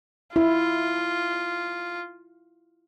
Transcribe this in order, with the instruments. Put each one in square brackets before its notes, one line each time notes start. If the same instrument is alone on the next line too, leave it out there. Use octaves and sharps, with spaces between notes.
[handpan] E4 [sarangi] F4